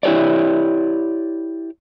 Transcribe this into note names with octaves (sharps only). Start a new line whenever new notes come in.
E4 G4 A4 C#5 D5